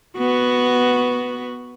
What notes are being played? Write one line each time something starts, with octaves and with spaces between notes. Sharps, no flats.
B3 F#4